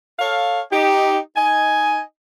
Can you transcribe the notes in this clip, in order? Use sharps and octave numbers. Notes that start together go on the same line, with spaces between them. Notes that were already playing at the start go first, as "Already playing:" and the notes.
A4 C#5 F5
D#4 G4
D#4 D#5 G#5